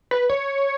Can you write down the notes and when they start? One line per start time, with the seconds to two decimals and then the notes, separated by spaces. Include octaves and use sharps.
0.11 B4
0.30 C#5